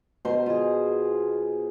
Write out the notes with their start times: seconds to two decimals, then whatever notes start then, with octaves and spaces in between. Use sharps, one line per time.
0.25 B2 C5
0.46 F4 G#4